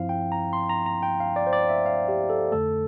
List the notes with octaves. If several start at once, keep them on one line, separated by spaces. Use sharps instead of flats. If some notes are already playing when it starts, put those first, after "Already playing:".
Already playing: G2 F3 C4 E4 F5
G5
A#5
C6
A#5
A#5
G5
F5
D5
C5
D5
E5
F5
G4
A4
F2 D3 A3 A4